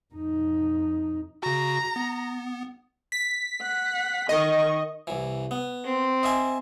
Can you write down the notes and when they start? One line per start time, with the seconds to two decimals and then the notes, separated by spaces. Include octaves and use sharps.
0.14 F2 D#4
1.43 C#3 F#4 A#5
1.96 B3
3.12 B6
3.62 F#5
4.29 D#3 D#5 C#6
5.07 C2 E3
5.51 B3
5.85 C4
6.23 D#5 E5 G#5